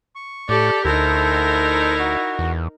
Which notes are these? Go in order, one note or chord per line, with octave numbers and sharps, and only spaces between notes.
C#6
A2 G4 A4 D5
D2 D#4 E4 A4 A#4 C5
F#4
E2